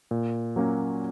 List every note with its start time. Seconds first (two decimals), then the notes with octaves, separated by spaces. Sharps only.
0.11 A#2
0.56 F#3 A#3 C#4 F#4